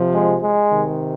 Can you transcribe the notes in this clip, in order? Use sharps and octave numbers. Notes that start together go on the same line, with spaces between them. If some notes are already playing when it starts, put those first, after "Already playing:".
Already playing: C3 F3
G#3
G#3
C3 D#3